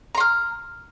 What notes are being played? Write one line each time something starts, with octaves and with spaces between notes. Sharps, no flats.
A#5 C6 F6